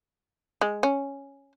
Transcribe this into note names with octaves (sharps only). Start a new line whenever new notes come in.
G#3
C#4